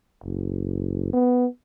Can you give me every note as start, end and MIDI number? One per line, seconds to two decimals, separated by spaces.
0.24 1.11 30
1.13 1.46 59